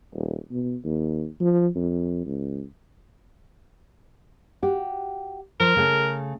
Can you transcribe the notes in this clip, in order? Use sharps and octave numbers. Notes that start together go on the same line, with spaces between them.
D#1
B2
D#2
F3
F2
C#2
F#4 G4
F3 A#4
C#3 A3